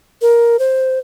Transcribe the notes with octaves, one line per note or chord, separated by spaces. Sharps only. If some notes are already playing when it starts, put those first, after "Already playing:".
A#4
C5